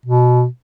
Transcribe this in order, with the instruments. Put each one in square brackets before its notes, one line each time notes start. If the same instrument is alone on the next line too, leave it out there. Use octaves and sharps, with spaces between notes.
[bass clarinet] B2